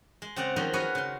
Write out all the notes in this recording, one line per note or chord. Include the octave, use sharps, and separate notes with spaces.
G#3
C#3 C4 D5 F#5 A#5
D#3 F3 F#3 A#3 C#4 D#4
C#4 F#4 G#4 A#4 B4 C#5
C#3 C6